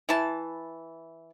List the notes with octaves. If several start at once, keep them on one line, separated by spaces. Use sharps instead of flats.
E3 E4 A5